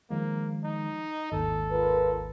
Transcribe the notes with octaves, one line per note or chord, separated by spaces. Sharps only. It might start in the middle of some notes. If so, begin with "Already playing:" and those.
D#3 F3 G#3 A#3
D#4
G#1 D#2 A4
F4 A#4 B4